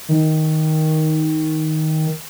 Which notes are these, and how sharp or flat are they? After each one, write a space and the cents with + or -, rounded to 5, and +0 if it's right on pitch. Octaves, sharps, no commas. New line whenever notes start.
D#3 +10